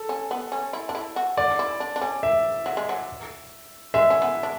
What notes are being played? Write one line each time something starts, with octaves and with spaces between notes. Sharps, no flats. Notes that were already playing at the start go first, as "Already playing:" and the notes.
Already playing: A4
C#4
B3
C#4
E4
D4
E4
F#4
F#4 D5
E4
D4
D4
C#4
E5
F#3
G#3
F#3
G#3 E5
C#4
B3
D4